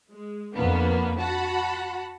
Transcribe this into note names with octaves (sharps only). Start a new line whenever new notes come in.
G#3
F2 F3 A#3 B3 D4
F#4 F#5 A5 B5